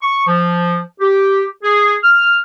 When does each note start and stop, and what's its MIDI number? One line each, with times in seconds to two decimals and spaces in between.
0.02 0.27 85
0.27 0.78 53
1.01 1.44 67
1.63 1.95 68
2.03 2.37 89